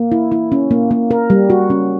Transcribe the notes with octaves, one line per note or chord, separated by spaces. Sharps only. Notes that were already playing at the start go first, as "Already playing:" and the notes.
Already playing: A#3
E4
E4
C#4
A#3
A#3
A#4
G3
F#4
C#4